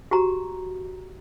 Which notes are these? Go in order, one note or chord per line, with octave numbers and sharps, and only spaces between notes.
F#4 G4 A#5